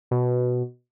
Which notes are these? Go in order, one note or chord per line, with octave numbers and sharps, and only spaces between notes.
B2